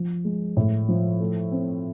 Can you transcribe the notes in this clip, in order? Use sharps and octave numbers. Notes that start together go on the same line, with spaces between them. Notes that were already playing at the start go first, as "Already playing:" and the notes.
Already playing: F3
G#3
A2
F3
A3
C4